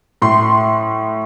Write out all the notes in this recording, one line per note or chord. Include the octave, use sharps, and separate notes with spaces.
A2 C6